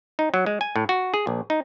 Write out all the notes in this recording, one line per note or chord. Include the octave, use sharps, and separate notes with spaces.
D#4
F#3
G#3
G#5
A2
F#4
G#4
A#1
D#4